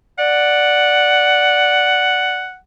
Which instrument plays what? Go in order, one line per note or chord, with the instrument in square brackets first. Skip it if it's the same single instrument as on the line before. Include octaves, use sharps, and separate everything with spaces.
[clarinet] D5 [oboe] F#5